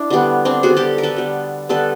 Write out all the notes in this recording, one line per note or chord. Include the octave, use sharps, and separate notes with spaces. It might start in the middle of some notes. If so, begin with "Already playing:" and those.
Already playing: D4 E4
D3 G3 B3
C4 D4
D3 G3 B3 F#4 G#4
G4 A4
A#4
A4 B4
D3 G3 B3
D3 G3 B3 A4 B4